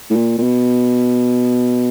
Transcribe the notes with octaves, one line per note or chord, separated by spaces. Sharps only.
A2
A#2
A#2
B2